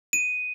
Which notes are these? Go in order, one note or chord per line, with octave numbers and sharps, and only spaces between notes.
D#7